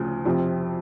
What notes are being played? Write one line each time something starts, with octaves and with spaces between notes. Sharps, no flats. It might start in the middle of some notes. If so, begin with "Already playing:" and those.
Already playing: D2 C#3 F3
F2 C3 F3